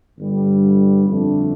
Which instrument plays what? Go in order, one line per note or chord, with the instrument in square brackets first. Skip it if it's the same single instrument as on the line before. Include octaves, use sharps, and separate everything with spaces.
[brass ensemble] G1 G2 D3 G3
G1 F2 D3 A3 D4